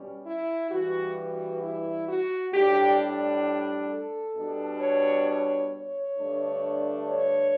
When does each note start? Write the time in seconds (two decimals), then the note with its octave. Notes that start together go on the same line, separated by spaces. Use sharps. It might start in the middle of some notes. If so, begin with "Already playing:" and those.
Already playing: B2 G3 C#4
0.25 E4
0.71 G2 E3 G3 F#4
1.16 F#4
1.61 E4
2.07 F#4
2.53 A2 G3 D4 G4
3.89 A4
4.35 B2 G3 D4
4.80 C#5
5.25 C#5
5.71 C#5
6.17 G2 D3 A3 D4
7.08 C#5